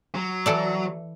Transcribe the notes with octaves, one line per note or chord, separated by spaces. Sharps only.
F#3
E3 A4 D5